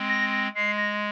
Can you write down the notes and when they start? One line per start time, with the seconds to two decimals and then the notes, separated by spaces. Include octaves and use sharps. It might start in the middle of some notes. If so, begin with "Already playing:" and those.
Already playing: G#3 C4
0.09 A#6
0.32 A#6
0.55 G#3 C7
0.77 A#6